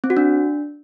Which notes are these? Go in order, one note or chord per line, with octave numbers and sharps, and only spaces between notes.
C4
F#4
D4